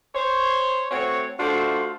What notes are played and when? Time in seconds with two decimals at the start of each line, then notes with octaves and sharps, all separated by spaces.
0.15 C5 C#5 C6
0.91 A3 C4 F#4 C#5
1.39 A3 D4 F4 F#4 A4 C5